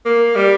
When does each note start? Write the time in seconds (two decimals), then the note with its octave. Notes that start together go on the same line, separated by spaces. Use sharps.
0.05 A#3
0.35 G3